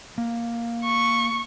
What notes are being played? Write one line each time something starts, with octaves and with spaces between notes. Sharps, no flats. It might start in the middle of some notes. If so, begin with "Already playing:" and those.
A#3
C#6